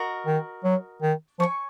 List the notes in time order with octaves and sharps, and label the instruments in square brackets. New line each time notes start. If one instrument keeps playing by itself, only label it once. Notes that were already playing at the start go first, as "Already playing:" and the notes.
Already playing: [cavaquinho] F#4 A#4 D#5
[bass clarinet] D#3
F#3
D#3
[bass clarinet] F3 [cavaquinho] C#5 G#5 C#6